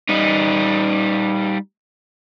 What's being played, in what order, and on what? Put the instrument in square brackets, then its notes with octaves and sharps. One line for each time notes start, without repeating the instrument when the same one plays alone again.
[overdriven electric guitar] G3 D#4